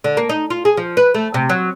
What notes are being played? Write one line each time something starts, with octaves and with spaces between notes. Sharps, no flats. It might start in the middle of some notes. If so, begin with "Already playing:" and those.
D3
A#3
D#4
F4
G#4
F3
B4
A3
C3
F#3